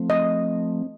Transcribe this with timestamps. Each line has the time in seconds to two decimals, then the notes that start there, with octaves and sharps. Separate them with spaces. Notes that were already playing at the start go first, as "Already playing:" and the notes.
Already playing: F3 A3 C4
0.10 D#5